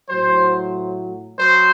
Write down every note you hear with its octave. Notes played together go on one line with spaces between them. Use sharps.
A2 F#3 C5
F#3 C5